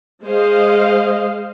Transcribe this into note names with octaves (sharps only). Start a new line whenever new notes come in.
G#3 C5 D#5 F5